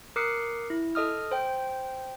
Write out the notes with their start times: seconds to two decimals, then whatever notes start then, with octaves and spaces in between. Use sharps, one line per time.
0.16 A#4 D6 D#6 F#6 C7 C#7
0.70 E4
0.95 A4 D#5 D#6 F6
1.31 C5 G5